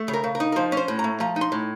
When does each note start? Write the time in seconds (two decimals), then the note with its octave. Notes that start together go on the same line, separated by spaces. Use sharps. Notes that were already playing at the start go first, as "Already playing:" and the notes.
Already playing: A3
0.08 C#3
0.13 A#4
0.24 C#3
0.35 A#4
0.40 D#4
0.52 A#4
0.56 F3 C5
0.72 C#4
0.77 C5
0.88 A2
0.99 A#5
1.04 A3
1.20 F3 A#5
1.36 D#4
1.41 C6
1.52 A2